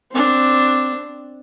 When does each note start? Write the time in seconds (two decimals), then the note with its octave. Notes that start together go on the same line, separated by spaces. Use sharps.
0.12 C4 D4